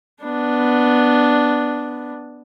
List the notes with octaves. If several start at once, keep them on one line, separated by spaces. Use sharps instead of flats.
B3 D4